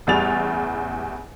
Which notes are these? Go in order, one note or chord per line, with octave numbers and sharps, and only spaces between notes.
A1 E2 G3 G#4 A6 F7